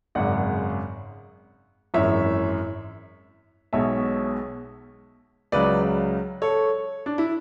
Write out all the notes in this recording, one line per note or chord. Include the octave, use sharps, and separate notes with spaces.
G#1 F#2 C#3 D5 F#5
G#1 F#2 E3 C#5 E5
B1 B2 G#3 C#5 E5
C#2 C#3 F#3 B4 D5
A4 C#5
D4
E4